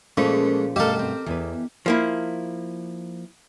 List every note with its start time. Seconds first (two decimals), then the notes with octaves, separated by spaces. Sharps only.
0.17 A#2 F3 G#3 A3 C#4 F4 A#4 C5
0.76 G2 B2 A3 G4 A4 A#4 D#5 F5
0.99 C4
1.26 E2 E3 B4
1.86 F3 A#3 E4